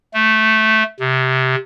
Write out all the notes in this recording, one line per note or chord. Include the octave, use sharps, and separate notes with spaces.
A3
C3